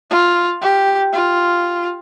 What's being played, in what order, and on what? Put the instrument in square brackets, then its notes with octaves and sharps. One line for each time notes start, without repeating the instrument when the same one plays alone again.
[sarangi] F4
G4
F4